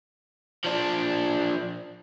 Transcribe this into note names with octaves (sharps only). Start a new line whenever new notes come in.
F3 D4